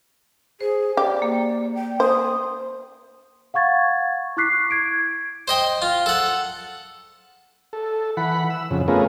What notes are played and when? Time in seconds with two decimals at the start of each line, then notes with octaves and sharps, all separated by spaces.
0.61 G#4 C5
0.97 G4 D5
1.22 A#3
1.75 G5
2.00 C5 D#6
3.54 F5 F#5 C#6 G#6 A6
4.37 E4 C#6 D6 F#6 B6 C7
4.71 G#6 D7
5.48 C5 D#5 G5
5.82 F4
6.06 A4 F#5
7.73 A4
8.17 E3 F#5 B5
8.50 E6
8.70 F2 C#3
8.88 A3 B3 C#4 F4 G#4 A#4